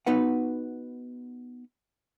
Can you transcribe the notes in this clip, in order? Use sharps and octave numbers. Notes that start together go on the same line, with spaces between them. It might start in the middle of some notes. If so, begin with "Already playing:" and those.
B3 D#4 F#4 B4 F#5